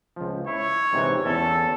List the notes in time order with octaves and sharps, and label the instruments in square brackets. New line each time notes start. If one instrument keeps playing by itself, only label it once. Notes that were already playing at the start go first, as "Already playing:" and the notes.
[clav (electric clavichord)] C#2 F3
[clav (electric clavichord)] E4 [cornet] C#5
[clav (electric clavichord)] G#2 C3 E3
[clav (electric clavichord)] E2 C#4 [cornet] A4